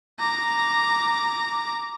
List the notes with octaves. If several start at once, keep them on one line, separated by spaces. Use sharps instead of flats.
A#5 D6